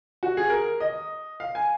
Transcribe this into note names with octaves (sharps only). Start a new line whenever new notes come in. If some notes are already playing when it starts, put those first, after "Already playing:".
F#4
G#4
A#4
D#5
F5
G#5